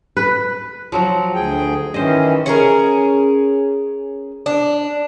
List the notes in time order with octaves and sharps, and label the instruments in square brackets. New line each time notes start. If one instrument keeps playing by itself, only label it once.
[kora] B4
F3 F#3 F#4
[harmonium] D2 G#4 G5
[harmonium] D#3 E3 C#4 [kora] C5 D#5
[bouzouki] C#4 G#4 A#4
D4